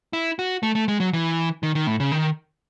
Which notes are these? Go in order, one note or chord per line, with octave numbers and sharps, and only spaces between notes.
E4
F#4
A3
A3
G#3
F#3
E3
D#3
D#3
A2
C#3
D#3